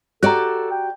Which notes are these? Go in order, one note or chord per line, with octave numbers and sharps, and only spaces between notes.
F#4 G4 A4 D5 A#5 F#6
G5